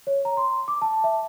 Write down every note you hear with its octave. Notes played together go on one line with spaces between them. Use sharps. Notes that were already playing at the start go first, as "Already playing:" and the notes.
C#5
A#5
C6
D6
A5
E5